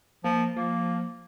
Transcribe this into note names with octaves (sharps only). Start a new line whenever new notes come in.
F3 A#3
F3 A#3